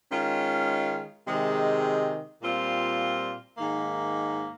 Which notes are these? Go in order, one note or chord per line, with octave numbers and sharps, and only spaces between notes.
D#3 G#3 C#4 F4
C3 D#3 G#3
A#2 G3 C4 F4
G#2 D#3 A#3